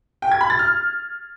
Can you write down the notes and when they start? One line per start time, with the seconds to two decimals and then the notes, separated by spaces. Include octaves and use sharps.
0.22 G5
0.32 G#6
0.41 B5
0.50 A6
0.59 F6